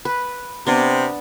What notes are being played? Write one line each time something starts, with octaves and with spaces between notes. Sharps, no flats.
B4
C3 B3 D4